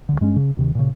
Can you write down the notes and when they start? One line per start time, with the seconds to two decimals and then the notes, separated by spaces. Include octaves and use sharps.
0.09 C#2 D3
0.21 G2 G#3 A3 C#4
0.36 C#3
0.57 D2 C3 D#3
0.75 A#2 C#3